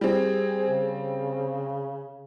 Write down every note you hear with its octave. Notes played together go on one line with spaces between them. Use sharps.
G3 C4 G#4
C#3